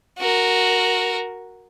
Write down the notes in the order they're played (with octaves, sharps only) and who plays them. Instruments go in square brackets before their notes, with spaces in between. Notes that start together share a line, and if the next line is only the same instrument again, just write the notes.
[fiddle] F#4 A#4